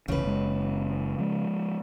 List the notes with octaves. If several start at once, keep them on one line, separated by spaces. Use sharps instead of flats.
F1 C2 C#3 E3 B4
F#1 G#3
F3 G#3